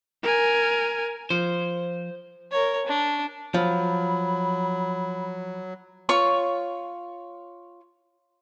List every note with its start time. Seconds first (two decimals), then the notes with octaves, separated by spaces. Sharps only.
0.23 A#4 G#5
1.30 F3 C5
2.52 A#4 C#5
2.87 D4
3.54 F3 F#3 B5
6.09 F4 C#5 C#6